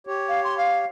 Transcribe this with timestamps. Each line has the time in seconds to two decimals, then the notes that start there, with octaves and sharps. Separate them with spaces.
0.07 G4 C#5
0.28 F5
0.44 C6
0.58 F5